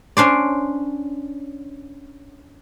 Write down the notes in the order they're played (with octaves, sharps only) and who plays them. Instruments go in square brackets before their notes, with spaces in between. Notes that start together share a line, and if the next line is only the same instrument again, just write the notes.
[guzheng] C#4 D4 C5 D5